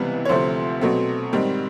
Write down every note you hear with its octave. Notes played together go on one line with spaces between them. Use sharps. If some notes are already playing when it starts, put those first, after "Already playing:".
Already playing: C#2 C3 E3 G3 B3 B4
C#5
D2 C3 F3 A3 C5
B2 F#3 A3 C4
G#2 D#3 G3 C4